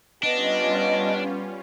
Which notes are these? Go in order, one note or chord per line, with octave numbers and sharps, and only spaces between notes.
G3 B3 C#4 D4 F4 D#5